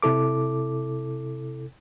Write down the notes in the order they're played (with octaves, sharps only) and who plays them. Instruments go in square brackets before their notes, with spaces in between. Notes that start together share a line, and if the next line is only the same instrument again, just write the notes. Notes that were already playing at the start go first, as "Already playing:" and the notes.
[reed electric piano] C3 E4 A4 D6